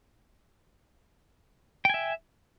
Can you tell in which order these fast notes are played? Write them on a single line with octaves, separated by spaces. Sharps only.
G5 G#5 E5